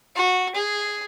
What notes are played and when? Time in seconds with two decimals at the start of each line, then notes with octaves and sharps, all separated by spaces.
0.16 F#4
0.55 G#4